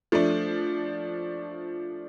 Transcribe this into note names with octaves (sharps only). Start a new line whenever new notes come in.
F3 A3 D4